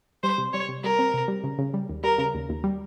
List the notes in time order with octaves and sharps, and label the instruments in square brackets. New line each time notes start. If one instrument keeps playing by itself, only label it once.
[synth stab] G3 [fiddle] C5
[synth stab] C3
[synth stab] G3 [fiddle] C#5
[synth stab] C3
[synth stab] G3 [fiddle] A#4
[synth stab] C4
C3
G3
C#3
C#3
G3
D#2
[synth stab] G3 [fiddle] A#4
[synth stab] C#3
D#2
D#2
G3